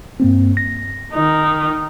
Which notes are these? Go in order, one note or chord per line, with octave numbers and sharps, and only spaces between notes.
G2 A#3 C4
A#6
D#3 D#4